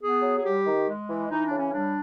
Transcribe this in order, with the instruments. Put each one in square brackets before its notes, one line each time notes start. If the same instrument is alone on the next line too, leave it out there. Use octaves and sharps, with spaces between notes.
[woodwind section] B3 G#4
F#3
G#4
G3 G4
D#3
G#3
E3
E3 D#4
D4
C#3
C#4
G3 D4